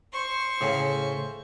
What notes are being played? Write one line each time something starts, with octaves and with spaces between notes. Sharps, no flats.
C5 C#6
A2 C#3 C#4